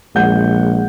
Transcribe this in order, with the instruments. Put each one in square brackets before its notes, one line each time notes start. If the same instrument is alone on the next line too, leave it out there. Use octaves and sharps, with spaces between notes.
[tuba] A#1 [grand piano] G#3 F#5 G6